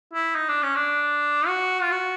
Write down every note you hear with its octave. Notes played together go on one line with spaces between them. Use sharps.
E4
D#4
D4
C#4
D4
F#4
F4
F#4